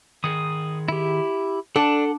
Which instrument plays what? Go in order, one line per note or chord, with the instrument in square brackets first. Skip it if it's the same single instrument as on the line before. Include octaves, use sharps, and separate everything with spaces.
[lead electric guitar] D#3 G#4 [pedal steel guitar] D#6
[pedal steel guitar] E4 G4
[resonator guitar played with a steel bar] D4 [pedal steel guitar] A4 A5 [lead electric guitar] F#5